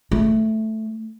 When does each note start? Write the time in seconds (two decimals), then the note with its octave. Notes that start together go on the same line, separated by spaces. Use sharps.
0.12 A3